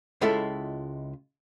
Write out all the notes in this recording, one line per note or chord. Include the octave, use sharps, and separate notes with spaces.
C#2 G#3 E4 F4 A4 E5